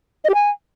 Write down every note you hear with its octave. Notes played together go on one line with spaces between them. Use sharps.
D#5
G4
G#5